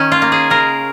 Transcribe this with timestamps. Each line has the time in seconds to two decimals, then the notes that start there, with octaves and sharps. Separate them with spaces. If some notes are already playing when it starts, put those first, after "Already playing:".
Already playing: D#3 C#4
0.12 F4
0.22 A#3
0.32 G#4
0.50 C#3 A#4